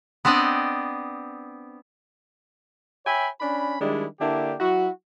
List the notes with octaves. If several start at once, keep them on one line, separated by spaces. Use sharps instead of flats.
B3 C4 D4 D5 D#5
C#5 E5 G5 G#5 B5
C#4 D4 B5
D#3 G3 G#3 D4 E4
D3 A#3 D4 E4 G4
F#3 E4 F#4